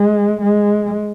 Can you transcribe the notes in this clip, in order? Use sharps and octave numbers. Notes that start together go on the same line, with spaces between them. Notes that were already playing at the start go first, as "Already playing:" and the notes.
Already playing: G#3
G#3